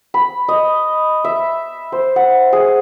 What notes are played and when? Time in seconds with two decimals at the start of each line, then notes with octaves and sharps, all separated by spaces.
0.14 B5
0.48 D#5
1.24 E5
1.92 C5
2.16 F#5
2.53 G#4